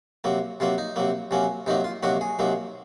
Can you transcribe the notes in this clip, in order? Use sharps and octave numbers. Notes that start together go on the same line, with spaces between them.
C3 F#3 A#3
C3 F#3 A#3 F4
D#4
C3 F#3 A#3
C3 F#3 A#3 C#4
C3 D#3 F#3 A#3 D#4
F4
C3 D#3 F#3 A#3 F#4
G#4
C3 D#3 F#3 A#3